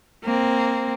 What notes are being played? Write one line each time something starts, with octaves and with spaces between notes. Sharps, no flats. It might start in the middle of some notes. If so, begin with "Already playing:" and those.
A#3 C4